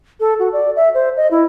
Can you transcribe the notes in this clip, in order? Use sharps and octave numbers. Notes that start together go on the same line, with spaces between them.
A4
F#4
D5
E5
C5
D#5
E4